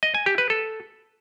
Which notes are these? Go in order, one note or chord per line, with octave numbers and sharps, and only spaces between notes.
D#5
G#5
G4
B4
A4